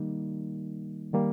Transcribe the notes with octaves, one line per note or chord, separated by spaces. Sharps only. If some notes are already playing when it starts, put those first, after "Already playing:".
Already playing: D#3 G3 A#3 D#4
D#3 G3 A#3